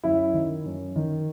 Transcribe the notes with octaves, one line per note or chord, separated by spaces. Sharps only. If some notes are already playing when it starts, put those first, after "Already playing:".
F#2 E4
D#3
F#2
D#3